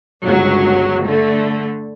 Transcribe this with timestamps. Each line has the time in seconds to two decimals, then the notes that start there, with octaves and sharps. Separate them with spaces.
0.23 G1 C#2 F#3
1.07 D3 A3